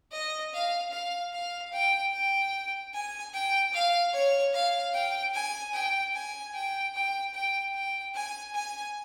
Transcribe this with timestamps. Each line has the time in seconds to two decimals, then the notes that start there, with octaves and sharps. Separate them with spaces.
0.12 D#5
0.53 F5
0.92 F5
1.33 F5
1.73 G5
2.13 G5
2.93 G#5
3.34 G5
3.73 F5
4.13 C#5
4.53 F5
4.93 G5
5.34 G#5
5.74 G5
6.14 G#5
6.54 G5
6.95 G5
7.34 G5
7.74 G5
8.15 G#5
8.54 G#5